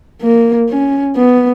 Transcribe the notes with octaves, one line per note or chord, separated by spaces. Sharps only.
A#3
C#4
B3